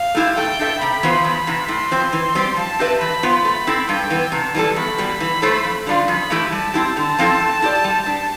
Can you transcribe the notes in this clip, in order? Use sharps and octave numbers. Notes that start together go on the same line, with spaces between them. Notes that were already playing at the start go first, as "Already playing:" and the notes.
Already playing: F5
A3 E4 G4
A3 G5
D4 A4 E5
C3 B5
E3 B3 F4 C5
E2
C3 E3
A2 C6
F3 C4
E3
G3 C4 G4
F3 A5
C4 G4 B4 E5
E3 B5
B3 F4 C5
A3 B5
C4 E4 A4
G2 G5
E3 B3
C3 A5
E3 G3 D4 A4
E2 B5
B2 G3
E3 B5
A3 E4 A4 C5
F2
D3 G3 D4 F4
F2 B5
E3 A3 E4 G4
G3 A5
C4 E4 G4
D3 A5
F3 C4 E4 A4
A3
E4 G4 D5
G3
D4 G4